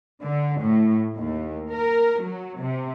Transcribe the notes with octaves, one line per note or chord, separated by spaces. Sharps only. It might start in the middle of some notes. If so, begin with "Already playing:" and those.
D3
A2
D#2
A#4
F#3
C3